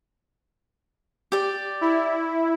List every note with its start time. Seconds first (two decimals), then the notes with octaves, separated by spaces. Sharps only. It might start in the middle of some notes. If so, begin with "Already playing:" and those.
1.32 G4 D5
1.81 E4